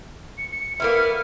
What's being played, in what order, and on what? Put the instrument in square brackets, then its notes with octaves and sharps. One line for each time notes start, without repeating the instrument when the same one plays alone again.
[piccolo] C#7
C#7
[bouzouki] A#3 B3 E4 [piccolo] F6